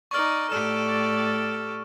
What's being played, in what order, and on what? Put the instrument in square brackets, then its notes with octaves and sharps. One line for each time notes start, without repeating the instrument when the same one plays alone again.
[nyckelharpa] D#4 D5 [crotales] C#6 F6
[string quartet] A2 D5 [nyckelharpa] G4 A4 [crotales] F6 E7